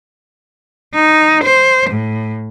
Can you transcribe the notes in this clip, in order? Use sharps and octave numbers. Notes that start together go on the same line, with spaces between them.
D#4
C5
A2